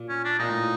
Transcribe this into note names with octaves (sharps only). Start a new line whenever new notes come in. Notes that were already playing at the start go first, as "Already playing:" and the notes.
Already playing: A#2
C#4
D4
A#2 D#4
A2